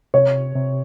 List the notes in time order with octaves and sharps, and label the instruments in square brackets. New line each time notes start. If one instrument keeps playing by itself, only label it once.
[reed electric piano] C3 [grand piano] C#5
[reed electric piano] C3